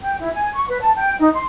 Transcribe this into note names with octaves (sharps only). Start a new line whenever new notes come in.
G5
E4
G#5
C#6
B4
A5
G5
D#4
C6